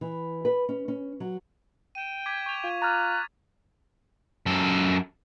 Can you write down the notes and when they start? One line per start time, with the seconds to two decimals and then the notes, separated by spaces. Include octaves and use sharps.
0.01 E3
0.45 B4
0.69 C#4
0.88 C#4
1.20 F#3
1.95 G5 D#7 E7
2.26 D6 G#6 B6
2.46 C#6 F7
2.64 F4
2.82 A#5 F6 F#6 A6
4.46 F#2 A4